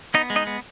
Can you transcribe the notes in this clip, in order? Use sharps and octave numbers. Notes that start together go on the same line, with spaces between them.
B3 D#4 D#5
G#3
D#4 D#5
B3